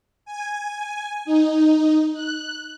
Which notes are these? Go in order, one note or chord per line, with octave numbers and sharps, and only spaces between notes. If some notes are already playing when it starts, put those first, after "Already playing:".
G#5
D#4
F#6